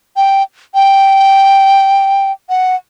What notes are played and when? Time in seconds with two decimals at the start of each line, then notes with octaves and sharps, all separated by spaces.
0.16 G5
0.74 G5
2.49 F#5